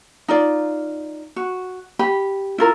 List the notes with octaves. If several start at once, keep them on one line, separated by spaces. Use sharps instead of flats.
D#4 F4 D5
F#4
G4 B5
E4 F4 A#4